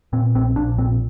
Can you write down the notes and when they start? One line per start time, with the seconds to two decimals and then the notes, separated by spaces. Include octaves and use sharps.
0.13 A#2 C4
0.35 A#1 C4
0.56 A#1 D4
0.78 A#2 C4